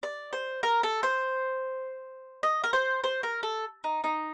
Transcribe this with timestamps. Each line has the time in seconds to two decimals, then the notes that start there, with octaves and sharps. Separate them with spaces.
0.03 D5
0.33 C5
0.63 A#4
0.83 A4
1.03 C5
2.43 D#5
2.64 A#4
2.73 C5
3.04 C5
3.23 A#4
3.43 A4
3.84 D#4
4.04 D#4